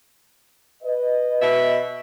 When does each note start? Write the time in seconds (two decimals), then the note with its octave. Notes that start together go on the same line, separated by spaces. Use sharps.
0.83 B4 D#5
1.42 B2 E5